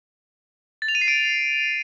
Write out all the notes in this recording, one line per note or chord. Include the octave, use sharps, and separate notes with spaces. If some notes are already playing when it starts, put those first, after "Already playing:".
A6
F7
D#7
C7
D7